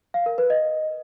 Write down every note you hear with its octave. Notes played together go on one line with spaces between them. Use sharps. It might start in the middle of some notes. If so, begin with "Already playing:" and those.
F5
A#4
B4
D#5